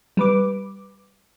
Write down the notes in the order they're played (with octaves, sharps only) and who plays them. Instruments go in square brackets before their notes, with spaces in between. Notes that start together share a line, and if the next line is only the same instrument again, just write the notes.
[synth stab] G3 B4 D6